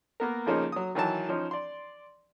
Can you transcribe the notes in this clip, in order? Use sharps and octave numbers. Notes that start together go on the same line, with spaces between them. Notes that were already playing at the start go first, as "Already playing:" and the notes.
A#3 B3 A#4
F2 C#3 F3 A#3 C#4 D#4
F#3 D#6
D#3 E3 F#3 A5
F3 C#4 D#4
D5 C6